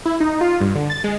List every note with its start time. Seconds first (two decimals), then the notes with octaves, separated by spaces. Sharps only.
0.05 E4
0.20 D#4
0.41 F4
0.60 G2
0.75 D3
0.90 A6
1.04 G#3